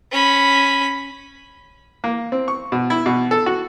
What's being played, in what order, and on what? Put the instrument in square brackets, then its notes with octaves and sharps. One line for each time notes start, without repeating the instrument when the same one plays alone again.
[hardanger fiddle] C#4 B5
[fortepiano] A#3
C4
C#6
B2
E4
B2
A4
F#4